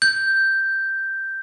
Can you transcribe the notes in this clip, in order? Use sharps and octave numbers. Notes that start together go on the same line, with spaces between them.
G6